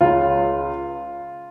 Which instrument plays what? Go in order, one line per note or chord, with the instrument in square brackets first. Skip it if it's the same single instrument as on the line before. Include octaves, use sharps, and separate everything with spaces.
[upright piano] C#2 C#3 F4